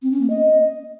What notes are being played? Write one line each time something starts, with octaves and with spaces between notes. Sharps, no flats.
C4
C#4
A#3
D#5